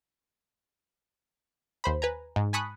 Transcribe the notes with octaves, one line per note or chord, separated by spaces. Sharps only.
D#2 C5 B5
B4 G#5 A#5
G#2
G#5 A5 B5 C#6 D#6 F#6